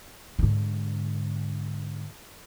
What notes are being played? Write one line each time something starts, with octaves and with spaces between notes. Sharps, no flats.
G#2 D3